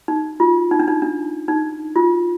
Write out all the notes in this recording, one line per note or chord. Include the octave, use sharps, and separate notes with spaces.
D#4
F4
D#4
D4
D#4
D4
D#4
F4